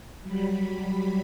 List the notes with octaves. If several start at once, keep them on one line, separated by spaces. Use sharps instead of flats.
F#3 G3 B5